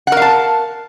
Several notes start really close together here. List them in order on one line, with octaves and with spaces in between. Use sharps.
F#5 A#4 F5 A5